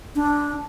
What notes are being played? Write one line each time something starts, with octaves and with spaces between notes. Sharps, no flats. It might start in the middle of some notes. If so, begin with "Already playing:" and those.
D4